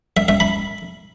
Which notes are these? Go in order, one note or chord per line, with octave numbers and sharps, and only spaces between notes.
E5
E5
B5